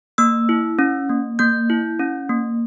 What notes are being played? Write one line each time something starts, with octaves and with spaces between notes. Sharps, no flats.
A#3 E6
E4
C#4
A#3
A#3 G6
E4
C#4
A#3